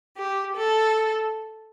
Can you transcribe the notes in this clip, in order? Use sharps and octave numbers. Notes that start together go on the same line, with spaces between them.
G4
A4